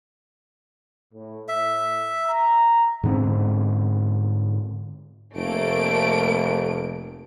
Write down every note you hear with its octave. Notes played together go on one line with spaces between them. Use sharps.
A2
A2 E5
A#5
G#2 D3 B3 C4
F1 A3 A#3 D7